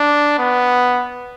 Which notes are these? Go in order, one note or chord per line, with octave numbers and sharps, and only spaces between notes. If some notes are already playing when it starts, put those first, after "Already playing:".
Already playing: D4
B3